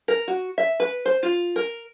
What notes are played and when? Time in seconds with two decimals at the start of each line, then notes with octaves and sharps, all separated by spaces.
0.08 A#4
0.28 F#4
0.58 E5
0.80 B4
1.05 C5
1.23 F4
1.56 A#4